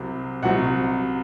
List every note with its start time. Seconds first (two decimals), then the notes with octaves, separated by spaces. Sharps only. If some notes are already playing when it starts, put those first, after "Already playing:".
Already playing: C2 C3 F#3
0.43 C2 C3 F#3 F#5